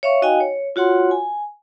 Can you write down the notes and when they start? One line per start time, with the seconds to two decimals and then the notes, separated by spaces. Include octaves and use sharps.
0.03 C#5 E5 F5 C#6
0.22 D#4 F#4 D#5 F5 G5 G#5
0.40 C#5
0.76 F4 F#4 C#5 F#5 C6
1.11 G#5